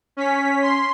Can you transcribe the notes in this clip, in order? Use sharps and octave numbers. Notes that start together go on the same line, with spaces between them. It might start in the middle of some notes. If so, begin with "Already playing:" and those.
C#4 B6
C6